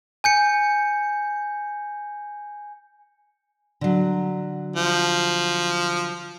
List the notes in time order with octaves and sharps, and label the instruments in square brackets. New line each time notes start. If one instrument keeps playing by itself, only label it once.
[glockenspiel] G#5 G6 C#7
[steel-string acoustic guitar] D3 F#3
[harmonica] F3